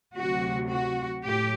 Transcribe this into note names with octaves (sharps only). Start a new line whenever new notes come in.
D2 C3 F#3 F#4
F#4
A2 F#3 G4